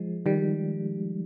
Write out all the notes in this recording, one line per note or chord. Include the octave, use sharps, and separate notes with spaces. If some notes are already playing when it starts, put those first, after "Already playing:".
Already playing: F3 G#3
D#3 G3